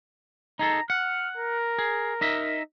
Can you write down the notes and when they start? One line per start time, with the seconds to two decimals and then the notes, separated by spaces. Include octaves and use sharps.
0.59 D#4 G#4 A4 A#5
0.90 F#5 F6
1.37 A#4
1.79 G#4
2.21 D#4 D#5 E5